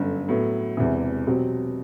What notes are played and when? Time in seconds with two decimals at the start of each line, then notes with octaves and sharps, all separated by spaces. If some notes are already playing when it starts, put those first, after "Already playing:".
Already playing: G1 F#2 D3
0.29 A2 F#3 B3
0.77 E1 E2 C3 E3
1.27 B2 F#3 C4 G4